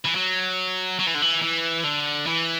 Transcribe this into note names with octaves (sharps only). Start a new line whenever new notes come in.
E3
F#3
F#3
E3
D3
E3
E3
D3
E3